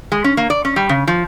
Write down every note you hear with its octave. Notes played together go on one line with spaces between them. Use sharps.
G#3
C#4
A#3
D5
C#4
G3
C#3
F3